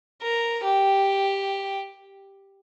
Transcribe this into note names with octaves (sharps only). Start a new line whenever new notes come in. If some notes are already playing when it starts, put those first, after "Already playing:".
A#4
G4